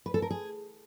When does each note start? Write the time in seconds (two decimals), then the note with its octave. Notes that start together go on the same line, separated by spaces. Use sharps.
0.06 B4
0.14 A4
0.22 A#4
0.31 G#4